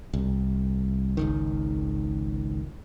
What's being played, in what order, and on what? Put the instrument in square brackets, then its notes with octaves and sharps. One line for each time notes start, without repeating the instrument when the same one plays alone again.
[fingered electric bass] C2
G#1 C#2 D#3